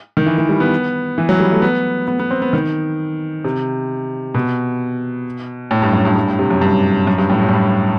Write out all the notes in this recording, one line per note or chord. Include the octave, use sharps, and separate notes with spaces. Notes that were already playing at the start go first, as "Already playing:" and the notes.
D#3
E3
E3
G3
B3
E3
F#3
G3
A3
B3
B3
B3
C4
B3
D#3
C3
B2
A2
G2
F#2
G2
G2
A2
C3
F#2
G2
F#2
G2
A2
G2
A2
G2